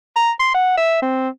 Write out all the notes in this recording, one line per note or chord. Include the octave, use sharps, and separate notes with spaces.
A#5
C6
F#5
E5
C4